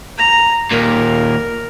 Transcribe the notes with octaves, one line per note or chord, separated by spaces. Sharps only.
A#5
D#2 A#2 A#4